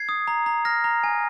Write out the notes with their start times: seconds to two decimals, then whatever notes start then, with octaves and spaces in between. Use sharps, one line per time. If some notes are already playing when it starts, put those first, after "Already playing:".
Already playing: G#6 C7
0.09 D#6
0.27 A#5
0.46 A#5
0.65 F6 A#6
0.84 A#5
1.04 G#5